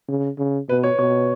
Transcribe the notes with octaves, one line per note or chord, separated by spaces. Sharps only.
C#3
C#3
B2 B4
C#5
B2 C#5